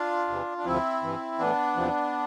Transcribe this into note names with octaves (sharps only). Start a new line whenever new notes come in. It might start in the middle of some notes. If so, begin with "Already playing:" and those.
Already playing: D4 F4
E2 C3 E3
D4
D2 C3 F3 C4 E4
G2 E3
A2 E3 B3 D4
E2 C3 F3